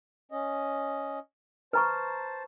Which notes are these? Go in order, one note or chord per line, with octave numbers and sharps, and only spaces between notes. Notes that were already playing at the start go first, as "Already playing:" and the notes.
C#4 D#5
B4 C5 A5 A#5 C#6